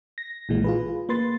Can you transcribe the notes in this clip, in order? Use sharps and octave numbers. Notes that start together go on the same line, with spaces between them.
A#6
A#1 A#2 E3 G#3
F4 G#4 B4
A#3 B4 C6 A6